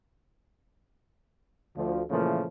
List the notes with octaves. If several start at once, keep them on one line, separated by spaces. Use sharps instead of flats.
D2 F3
A#2 C#3 E3 F3 A3 A#3